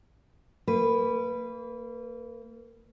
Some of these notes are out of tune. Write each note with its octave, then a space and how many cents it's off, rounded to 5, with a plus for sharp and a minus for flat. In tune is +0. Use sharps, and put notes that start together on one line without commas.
A#3 -30 B4 +0